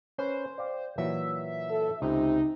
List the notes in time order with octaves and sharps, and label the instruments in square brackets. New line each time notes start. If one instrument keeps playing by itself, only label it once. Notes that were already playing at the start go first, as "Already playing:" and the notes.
[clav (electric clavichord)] C#4 B4 [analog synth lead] C5
[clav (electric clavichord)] D5 F5 G5
[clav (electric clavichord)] A#2 E3 F#3 [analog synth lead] E5
[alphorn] A4
[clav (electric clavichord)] C#2 [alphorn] C3 [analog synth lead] D#4